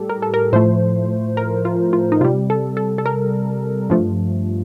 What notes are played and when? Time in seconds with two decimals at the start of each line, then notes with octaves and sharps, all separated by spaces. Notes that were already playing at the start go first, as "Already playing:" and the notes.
Already playing: A2 G3 G4 A4
0.09 A#4
0.22 A4
0.34 A#4
0.53 A2 F3 A3 C5
1.37 A#4
1.65 F4
1.93 F4
2.12 D#4
2.21 C3 G3 F4
2.50 A4
2.77 A4
2.98 A4
3.06 A#4
3.90 G2 F3 A3